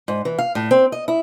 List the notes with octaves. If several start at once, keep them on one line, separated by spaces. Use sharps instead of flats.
G#2
E3
F5
A2
C4
D#5
E4